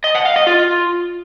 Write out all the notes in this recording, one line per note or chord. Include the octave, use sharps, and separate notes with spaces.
D#5
F#5
F5
D#5
F4